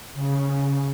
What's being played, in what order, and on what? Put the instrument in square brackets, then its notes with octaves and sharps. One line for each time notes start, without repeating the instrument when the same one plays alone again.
[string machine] C#3